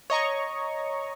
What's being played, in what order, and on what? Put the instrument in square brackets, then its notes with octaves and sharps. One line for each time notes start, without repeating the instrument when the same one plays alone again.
[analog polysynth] C#5 D#5 A#5 C#6